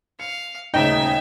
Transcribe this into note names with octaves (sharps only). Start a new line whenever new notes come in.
F5 C#7
D#1 D2 C#3 D#4 D#5 E5 G5